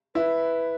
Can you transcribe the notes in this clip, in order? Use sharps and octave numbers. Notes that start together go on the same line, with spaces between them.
E4 B4